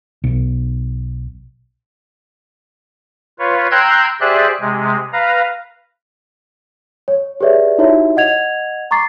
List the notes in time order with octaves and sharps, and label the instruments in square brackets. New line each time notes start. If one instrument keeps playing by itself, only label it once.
[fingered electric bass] B1
[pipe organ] F4 B4 C#5
G5 A#5 C6 E6 F#6 G#6
G4 G#4 C5 D5 E5 F#6
C3 G#3
B4 F5 A#5
[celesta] C#5
G4 G#4 B4 C#5 D5 E5
D#4 E4 F#4 G4 C#5 E5
D#5 F#5 G#6 F7
A#5 C#6 D6 A6 C7